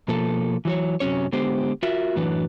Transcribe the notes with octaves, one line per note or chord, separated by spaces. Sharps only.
B2 F3 A#3 A4
E3 F#3 C#5
F#2 C3 F#3 C#4 C#5
D3 G#3 B3 G4 C5
F4 F#4 A#4 E5
F#2 A2 E3 F#3 D4 B4